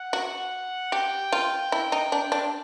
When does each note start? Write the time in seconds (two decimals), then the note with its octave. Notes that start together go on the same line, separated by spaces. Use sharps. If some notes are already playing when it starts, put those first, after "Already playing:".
Already playing: F#5
0.13 F#4
0.92 G4 G5
1.33 F4
1.72 E4
1.92 D#4
2.12 D4
2.32 D4